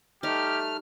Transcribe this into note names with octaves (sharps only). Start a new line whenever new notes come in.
G3 A3 D#4 G4 F6